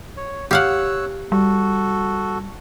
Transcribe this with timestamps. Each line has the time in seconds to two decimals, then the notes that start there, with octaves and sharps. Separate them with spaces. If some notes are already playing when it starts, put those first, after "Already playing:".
0.17 C#5
0.51 G4 C#5 F5 F#5 E6 F#6
1.32 G3 F#4 A4